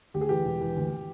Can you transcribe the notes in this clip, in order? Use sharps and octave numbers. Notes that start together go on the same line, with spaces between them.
D2 G4
G#4
E3 G4
E1
E3
D2